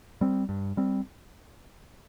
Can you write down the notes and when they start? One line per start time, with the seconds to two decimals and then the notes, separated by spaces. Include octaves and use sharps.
0.21 G3 C4
0.49 G2
0.77 G3 C4